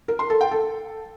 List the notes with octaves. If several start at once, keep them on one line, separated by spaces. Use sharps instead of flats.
A#4
C6
A4
G5
A4